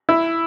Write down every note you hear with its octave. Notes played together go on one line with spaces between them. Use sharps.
E4